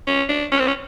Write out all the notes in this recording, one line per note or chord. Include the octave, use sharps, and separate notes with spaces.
C#4
D4
C#4
C4
C#4